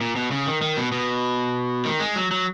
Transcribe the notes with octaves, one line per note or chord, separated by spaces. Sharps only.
A#2
B2
C#3
D#3
D#3
B2
B2
D#3
G#3
F#3
F#3